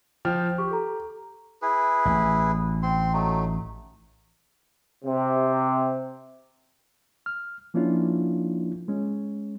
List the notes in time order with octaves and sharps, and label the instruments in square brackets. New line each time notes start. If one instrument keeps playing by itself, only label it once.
[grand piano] F3 G5 F6
[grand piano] G4 [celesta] C#6
[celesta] A4 A#5
[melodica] E4 G#4 B4
[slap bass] A1
[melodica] C4 C6
F#3 A3 D#4
[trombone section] C3
[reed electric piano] F6
F3 A#3 C#4 D4 E4 F4
G#3 C#4